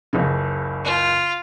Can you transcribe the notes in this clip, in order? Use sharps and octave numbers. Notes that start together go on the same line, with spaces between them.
F#1 C#2 C#3
F4